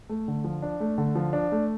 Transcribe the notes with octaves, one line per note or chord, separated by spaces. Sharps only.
A3
D3
F3
D4
A3
D3
F3
D4
A3